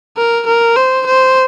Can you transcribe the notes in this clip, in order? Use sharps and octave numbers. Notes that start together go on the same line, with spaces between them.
A#4
A#4
C5
C5